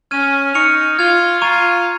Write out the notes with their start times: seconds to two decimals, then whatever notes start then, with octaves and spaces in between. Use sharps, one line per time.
0.11 C#4 F6 G#6 D#7
0.54 D#4 C#6 F6 C#7 F7
0.98 F4 F6 G#6 F7
1.41 F4 A#5 C#6 G#6 D#7